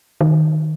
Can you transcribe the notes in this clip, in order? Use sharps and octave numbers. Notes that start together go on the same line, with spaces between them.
D#3